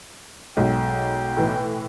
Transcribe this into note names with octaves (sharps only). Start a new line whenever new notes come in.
B1 G#2 B2 A4 G5
A2 E3